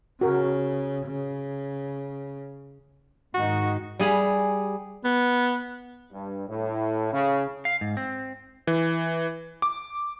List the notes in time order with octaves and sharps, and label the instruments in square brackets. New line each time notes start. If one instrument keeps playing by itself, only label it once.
[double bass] C#3 [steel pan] F#4 A#4
[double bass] C#3
[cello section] G#2 D#3 D#4 [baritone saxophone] F#4
[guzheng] G3 G#4 F5 B5
[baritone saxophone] B3
[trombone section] G2
A2
C#3
[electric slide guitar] F5
G#2
C4
[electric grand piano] E3
D6